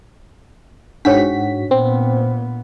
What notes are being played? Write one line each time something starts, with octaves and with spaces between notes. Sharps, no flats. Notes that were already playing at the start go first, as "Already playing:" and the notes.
G#2 D4 F#4 C#5 G5 B6
A#2 B3 C4